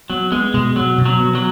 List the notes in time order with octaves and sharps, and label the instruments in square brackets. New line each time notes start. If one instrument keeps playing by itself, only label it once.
[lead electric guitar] F#3 [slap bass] B3
[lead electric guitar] G#3 [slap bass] B3
[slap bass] B2 [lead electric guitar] G#3
[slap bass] B2 [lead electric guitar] F#3
[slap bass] B2
[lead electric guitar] F#3
[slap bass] B3
[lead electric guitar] F#3